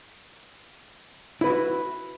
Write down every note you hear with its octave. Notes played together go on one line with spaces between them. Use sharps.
E4 F#4 B4